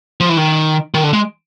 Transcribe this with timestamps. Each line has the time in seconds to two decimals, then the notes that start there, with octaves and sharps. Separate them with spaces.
0.20 F3
0.29 E3
0.37 D#3
0.94 D#3
1.04 D3
1.13 G#3